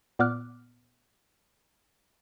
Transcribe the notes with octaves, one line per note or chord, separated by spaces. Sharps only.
A#2 B3 D5 D6 F6 F#6